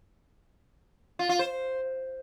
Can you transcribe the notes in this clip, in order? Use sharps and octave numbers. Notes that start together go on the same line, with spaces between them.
F4
F4
C5